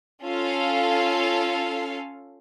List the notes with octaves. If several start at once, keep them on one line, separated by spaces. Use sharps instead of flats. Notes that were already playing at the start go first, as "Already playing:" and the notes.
C#4 F4 A4 F5